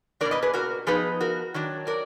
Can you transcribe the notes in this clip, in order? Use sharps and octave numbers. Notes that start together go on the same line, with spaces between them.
B2 A#3 D4 A#4 D5
B4 D#5
G#4 B4
F#4 A#4
F3 B3 D#4 G#4 B4
F#4 A#4
D#3 F#3 D4
A#4 D5